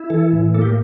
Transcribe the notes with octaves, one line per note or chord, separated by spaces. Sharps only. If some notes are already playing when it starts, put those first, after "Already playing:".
Already playing: E4
E3 A4
A2
A#3 A4
G4